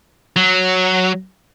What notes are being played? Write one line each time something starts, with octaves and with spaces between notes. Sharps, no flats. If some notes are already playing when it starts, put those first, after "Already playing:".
F#3